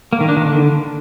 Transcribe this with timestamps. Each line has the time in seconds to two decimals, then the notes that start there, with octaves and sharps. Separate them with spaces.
0.13 A#3
0.21 D#3
0.29 D4
0.37 D#3
0.45 D3